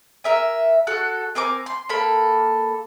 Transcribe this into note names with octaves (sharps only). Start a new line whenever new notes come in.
A#4 E5 G#5
F#4 A4 F#6
C4 A#4 G#5 D6
C6
A#3 A4 B5